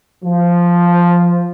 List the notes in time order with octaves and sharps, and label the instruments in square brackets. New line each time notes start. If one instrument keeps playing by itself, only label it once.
[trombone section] F3